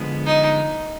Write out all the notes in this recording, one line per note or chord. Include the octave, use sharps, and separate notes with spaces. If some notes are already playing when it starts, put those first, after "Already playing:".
Already playing: D3 F3 G#3 B3
D#4